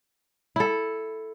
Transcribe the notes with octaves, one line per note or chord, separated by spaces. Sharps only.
E4 A4